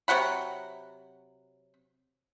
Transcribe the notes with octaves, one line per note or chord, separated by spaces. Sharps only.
C3 F#3 F#5 B5